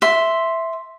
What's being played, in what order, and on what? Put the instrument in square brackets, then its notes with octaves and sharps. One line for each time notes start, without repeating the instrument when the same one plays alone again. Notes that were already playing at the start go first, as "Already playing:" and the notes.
[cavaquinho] E5 C6